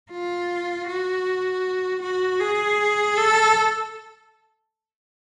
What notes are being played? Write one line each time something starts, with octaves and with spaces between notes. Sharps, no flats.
F4
F#4
F#4
G#4
A4